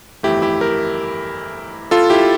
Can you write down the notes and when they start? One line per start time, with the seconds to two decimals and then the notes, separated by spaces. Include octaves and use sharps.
0.23 G1 F2 E3 A3 E4 G4
0.42 E4 G4
0.61 G4 A#4
1.91 F4 A4
2.10 E4 G4